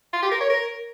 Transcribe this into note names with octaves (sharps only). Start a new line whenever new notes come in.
F4
G4
A#4
C#5
A#4